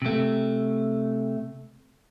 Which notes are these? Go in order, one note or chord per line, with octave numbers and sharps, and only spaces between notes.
C3 A3